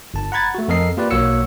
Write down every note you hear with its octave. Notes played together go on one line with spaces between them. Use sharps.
G1 A5
F#5 A#5 B5 G#6 A6
A3 F#4
F2 A4 A#4 D#5 C7
A#3 F4 G4 B4 D5
B1 A#3 F#4 C#5 E6 C#7